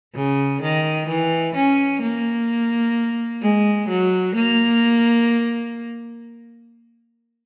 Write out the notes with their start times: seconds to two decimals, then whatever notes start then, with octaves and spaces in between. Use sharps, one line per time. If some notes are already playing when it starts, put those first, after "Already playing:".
0.15 C#3
0.62 D#3
1.08 E3
1.55 C#4
2.02 A#3
3.42 G#3
3.89 F#3
4.36 A#3